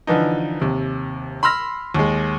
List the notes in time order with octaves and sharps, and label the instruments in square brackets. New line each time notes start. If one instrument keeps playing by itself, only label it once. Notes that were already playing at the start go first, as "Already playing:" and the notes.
[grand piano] D3 E3 F3 D#4
D#2 C3
B5 C6 E6 F6 A#6
D#2 G#3